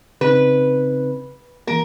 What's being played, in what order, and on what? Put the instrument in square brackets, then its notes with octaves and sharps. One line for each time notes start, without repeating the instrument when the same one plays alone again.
[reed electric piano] C#3 C4 D#4 [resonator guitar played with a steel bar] B4
[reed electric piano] E3 A#3 [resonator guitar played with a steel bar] A#4